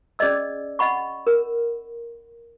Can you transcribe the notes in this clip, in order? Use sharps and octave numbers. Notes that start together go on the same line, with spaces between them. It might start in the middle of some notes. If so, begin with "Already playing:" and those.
C#4 G#4 D5 D#5 E6
D#5 F#5 B5 C#6
A#4